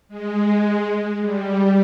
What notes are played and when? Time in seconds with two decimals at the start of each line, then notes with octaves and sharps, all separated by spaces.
0.09 G#3
1.21 G3